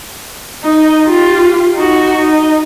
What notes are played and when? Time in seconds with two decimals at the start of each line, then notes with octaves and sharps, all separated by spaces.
0.63 D#4
1.05 F4 G4
1.74 D#4 F#4
2.17 D#4